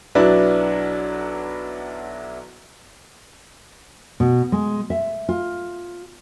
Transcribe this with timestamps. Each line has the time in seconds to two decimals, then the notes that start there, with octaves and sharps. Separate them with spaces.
0.15 B1 F#3 D4 E4 B4
4.20 B2
4.52 G#3
4.90 E5
5.29 F4